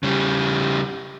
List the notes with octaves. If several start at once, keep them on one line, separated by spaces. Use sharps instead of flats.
C#3 G3